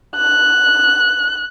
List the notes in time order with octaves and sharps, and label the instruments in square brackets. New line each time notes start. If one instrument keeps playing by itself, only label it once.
[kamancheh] F#6